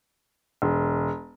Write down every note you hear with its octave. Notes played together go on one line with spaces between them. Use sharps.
E1